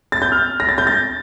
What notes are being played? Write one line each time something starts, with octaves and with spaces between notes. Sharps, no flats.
A6
G6
F6
A#6
A6
G6
A6